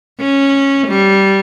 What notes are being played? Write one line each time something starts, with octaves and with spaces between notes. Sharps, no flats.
C#4
G3